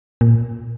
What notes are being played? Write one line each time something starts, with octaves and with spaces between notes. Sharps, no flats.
A#2